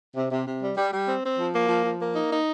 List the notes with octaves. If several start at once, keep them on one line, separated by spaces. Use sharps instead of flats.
C3
C3
C3
G3
G3
G3
C4
C4
F3
A#3
F3
F3
A#3
D#4
D#4